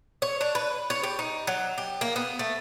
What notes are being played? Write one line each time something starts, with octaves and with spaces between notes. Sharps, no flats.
C#5
D4
B4
C#5
G4
D#4
F#3
G4
A#3
B3
A3